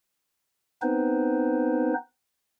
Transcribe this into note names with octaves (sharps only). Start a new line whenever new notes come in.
B3 C4 D#4 B4 C5